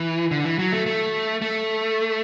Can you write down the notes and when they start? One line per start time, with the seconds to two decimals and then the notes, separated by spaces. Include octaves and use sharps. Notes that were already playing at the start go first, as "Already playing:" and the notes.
Already playing: E3
0.31 D3
0.44 E3
0.59 F#3
0.73 A3
0.86 A3
1.42 A3